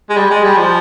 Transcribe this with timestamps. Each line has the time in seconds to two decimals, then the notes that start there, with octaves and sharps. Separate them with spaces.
0.10 G#3
0.17 G3
0.30 G#3
0.44 G3
0.58 F3